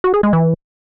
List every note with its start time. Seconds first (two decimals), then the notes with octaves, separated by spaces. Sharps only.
0.04 F#4
0.14 G#4
0.23 G#3
0.33 E3